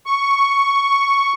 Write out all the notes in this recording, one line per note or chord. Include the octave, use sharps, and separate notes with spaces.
C#6